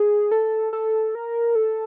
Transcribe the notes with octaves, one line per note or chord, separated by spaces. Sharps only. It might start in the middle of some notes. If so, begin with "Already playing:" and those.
Already playing: G#4
A4
A4
A#4
A4